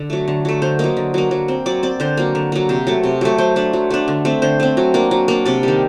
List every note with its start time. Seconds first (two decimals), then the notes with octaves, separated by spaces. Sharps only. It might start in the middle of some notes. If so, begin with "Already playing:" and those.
Already playing: D3
0.10 F#3 A3
0.28 D3
0.45 F#3 A3
0.62 D3 C5
0.79 F#3 A#3 D#5
0.97 D3
1.14 F#3 A#3
1.31 F#3
1.48 C4
1.66 F#3 D5
1.83 C4 D5
2.00 D3 C5
2.17 F#3 A#3
2.35 D3
2.52 F#3 A#3
2.69 C3 C5
2.87 F#3 A3
3.03 C3
3.21 F#3 A3
3.38 F#3 C5
3.56 A3 D4
3.73 F#3
3.90 A3 D4
4.08 D3
4.25 A3 C4
4.42 D3 C5
4.60 A3 C4
4.77 F#3
4.94 A#3 D4
5.11 F#3
5.28 A#3 D4
5.45 C3 D5
5.63 D#3 G3